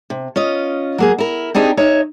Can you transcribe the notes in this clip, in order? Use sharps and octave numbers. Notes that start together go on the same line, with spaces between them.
C3
C#4 F4 D#5
F#3 A#3 G#4
E4 A#4
C4 D4 D#4 G4 G#4
D#4 C#5 E5